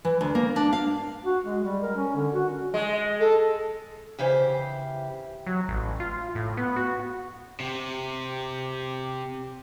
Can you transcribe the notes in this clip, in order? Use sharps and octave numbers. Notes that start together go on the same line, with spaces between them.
E3
D2
A#3
D4
F5
F#4
G#3
G3
A#4
C#4
D3
F#4
G#3
A4
C#3 E3 G4 C5 E5
F#3
A1
F4
A2
B3
F#4
C3 G4